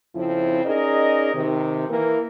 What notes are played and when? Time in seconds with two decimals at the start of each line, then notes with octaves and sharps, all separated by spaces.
0.15 F2 C#3 F3 C4 E4
0.64 C#4 D#4 G#4 A#4 D5 D#5
1.35 C3 D#3
1.89 E3 A#3 A#4